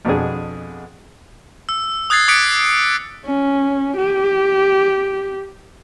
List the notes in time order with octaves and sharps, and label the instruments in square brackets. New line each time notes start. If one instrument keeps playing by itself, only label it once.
[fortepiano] F2 B2 B3 D4 G#4
[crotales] E6
D#6 F#6 G#6 A6 C7
D6 D#6 F#6 B6 C#7 D7
[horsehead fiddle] C#4
G4